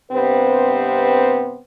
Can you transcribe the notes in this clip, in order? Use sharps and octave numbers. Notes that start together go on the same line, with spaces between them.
G2 C3 B3 C4 B4 C5